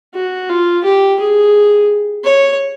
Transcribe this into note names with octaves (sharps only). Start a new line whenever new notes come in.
F#4
F4
G4
G#4
C#5